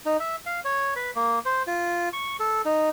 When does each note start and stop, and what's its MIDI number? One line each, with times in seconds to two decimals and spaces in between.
0.06 0.17 63
0.20 0.36 76
0.46 0.60 77
0.65 0.94 73
0.96 1.11 71
1.16 1.39 58
1.45 1.63 72
1.67 2.09 65
2.13 2.37 85
2.40 2.62 69
2.65 2.89 63